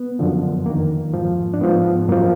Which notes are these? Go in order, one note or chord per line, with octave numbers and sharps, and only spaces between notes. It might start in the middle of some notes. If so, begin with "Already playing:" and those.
Already playing: B3
F#2 D3 F3
F2 D#3 A#3
G#2 F3
D4
G#2 F3 B3
F#2 F3 A#3